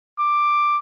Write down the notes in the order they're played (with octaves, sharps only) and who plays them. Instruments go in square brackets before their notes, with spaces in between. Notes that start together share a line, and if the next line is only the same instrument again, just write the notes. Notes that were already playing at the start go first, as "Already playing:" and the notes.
[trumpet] D6